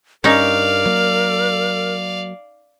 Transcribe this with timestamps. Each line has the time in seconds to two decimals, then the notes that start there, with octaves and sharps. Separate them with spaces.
0.24 G2 C#4 D#4 A#4 D5 F5
0.86 F#3 A#3